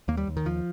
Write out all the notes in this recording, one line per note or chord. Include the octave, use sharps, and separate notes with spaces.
D#2 A#3
G3
D#2
D#3
D#2 F3